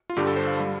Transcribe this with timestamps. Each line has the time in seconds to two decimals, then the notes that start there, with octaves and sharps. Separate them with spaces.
0.10 F4
0.16 G2 D3 G3 G4
0.27 A4
0.36 C5
0.47 F5
0.60 G3